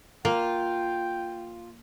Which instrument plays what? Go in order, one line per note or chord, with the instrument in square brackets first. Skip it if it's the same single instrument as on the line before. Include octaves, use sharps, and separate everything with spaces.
[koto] A#3 [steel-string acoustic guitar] F4 [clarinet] G5